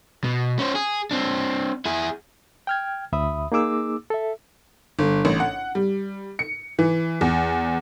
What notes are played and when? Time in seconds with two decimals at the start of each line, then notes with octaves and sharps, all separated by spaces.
0.24 B2
0.59 C#4 C5
0.75 G#4
1.11 C4 D4
1.85 E4 G#4
2.67 G5 F6 G#6
3.13 D2 E5 B5 D#6
3.52 A#3 D#4 G#4 D6 E6
4.10 A4 E5
4.99 G1
5.25 A1
5.40 F#5
5.75 G3
6.39 C#7
6.79 E3
7.21 E2